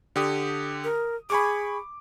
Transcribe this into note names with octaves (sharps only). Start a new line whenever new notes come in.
D3 G4 D#6
A#4
G#4 B5 C#6 D6